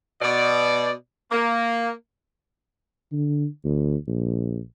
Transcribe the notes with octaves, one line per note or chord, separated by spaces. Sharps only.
B2 D5
A#3
D3
D2
A#1